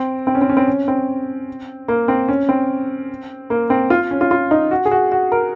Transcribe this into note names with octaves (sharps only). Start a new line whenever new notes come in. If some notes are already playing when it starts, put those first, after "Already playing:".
Already playing: C4
C4
C#4
C4
C#4
C4
C#4
C4
A#3
C4
C#4
C4
A#3
C4
F4
C#4
F4
F4
D#4
F#4
G#4
F#4
F#4
A#4